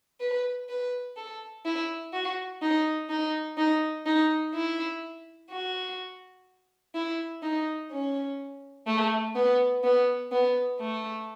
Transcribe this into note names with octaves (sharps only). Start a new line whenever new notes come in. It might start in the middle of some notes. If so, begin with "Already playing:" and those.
B4
B4
A4
E4
F#4
D#4
D#4
D#4
D#4
E4
F#4
E4
D#4
C#4
A3
B3
B3
B3
A3